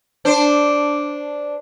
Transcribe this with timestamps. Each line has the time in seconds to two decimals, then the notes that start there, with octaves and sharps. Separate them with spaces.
0.25 D4 C5